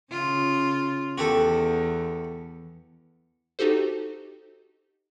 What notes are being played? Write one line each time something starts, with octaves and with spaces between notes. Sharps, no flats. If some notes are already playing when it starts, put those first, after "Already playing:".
C#3 F4
E2 F#4 G4 A4
D#4 F#4 G4 A4 C5